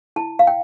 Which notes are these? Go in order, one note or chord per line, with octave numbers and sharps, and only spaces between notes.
E4 A5
F5
G5